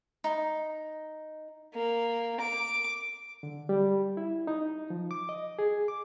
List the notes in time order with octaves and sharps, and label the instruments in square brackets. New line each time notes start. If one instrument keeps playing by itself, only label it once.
[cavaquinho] D#4
[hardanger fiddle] A#3
D6
[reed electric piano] D3
G3
E4
D#4
F3
D6
D#5
G#4
D6